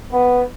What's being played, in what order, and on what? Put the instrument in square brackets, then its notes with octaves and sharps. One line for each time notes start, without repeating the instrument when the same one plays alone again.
[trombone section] B3